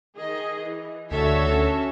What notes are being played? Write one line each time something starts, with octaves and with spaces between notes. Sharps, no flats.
D#3 G#4 D#5
E3
D2 D3 F#4 A4 C#5 E5
C#4